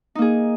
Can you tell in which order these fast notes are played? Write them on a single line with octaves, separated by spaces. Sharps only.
D#4 A#3 G#4